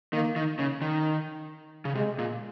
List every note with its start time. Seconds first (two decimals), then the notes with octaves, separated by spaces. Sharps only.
0.13 D#3 A#3
0.36 D#3
0.59 C#3
0.82 D#3
1.85 C#3
1.95 C3 G#3
2.18 A#2